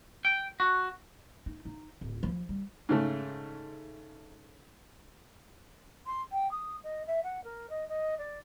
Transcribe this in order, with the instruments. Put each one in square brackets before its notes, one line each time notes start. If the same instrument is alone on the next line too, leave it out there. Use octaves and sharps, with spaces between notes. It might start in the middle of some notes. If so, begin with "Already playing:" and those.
[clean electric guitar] G5
F#4
[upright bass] D#4
D#4
D1
F3
G3
[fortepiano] G#2 C#3 A3
[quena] C6
G5
D#6
D#5
E5
F#5
A#4
D#5
D#5
D5